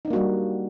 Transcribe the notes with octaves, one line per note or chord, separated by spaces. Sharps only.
G3 A#3 D4 D#4 F#4